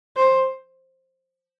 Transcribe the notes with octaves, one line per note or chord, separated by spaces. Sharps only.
C5